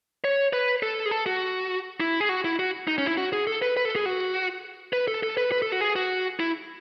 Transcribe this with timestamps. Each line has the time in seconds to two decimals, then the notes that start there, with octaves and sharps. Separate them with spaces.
0.24 C#5
0.53 B4
0.83 A4
1.06 G#4
1.11 A4
1.26 F#4
2.00 E4
2.21 G#4
2.29 F#4
2.45 E4
2.59 F#4
2.88 D#4
2.98 C#4
3.07 E4
3.17 F#4
3.33 G#4
3.47 A4
3.62 B4
3.77 B4
3.85 A4
3.96 G#4
4.06 F#4
4.93 B4
5.08 A4
5.23 A4
5.37 B4
5.52 B4
5.62 A4
5.72 F#4
5.81 G#4
5.96 F#4
6.40 E4